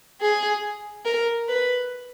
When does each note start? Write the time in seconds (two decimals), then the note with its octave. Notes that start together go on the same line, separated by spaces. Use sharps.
0.21 G#4
1.05 A#4
1.48 B4